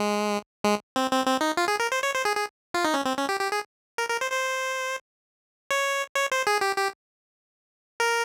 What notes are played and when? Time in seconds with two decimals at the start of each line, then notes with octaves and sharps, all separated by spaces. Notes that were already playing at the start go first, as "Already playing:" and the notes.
Already playing: G#3
0.64 G#3
0.96 C4
1.11 C4
1.26 C4
1.41 D#4
1.57 F4
1.68 G#4
1.80 A#4
1.92 C5
2.03 C#5
2.15 C5
2.25 G#4
2.37 G#4
2.74 F4
2.85 D#4
2.94 C#4
3.05 C4
3.18 C#4
3.29 G4
3.40 G4
3.52 G#4
3.98 A#4
4.09 A#4
4.21 C5
4.32 C5
5.71 C#5
6.15 C#5
6.32 C5
6.47 G#4
6.61 G4
6.77 G4
8.00 A#4